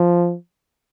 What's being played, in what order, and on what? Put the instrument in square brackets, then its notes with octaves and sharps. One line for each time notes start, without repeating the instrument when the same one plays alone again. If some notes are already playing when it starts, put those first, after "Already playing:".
Already playing: [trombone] F3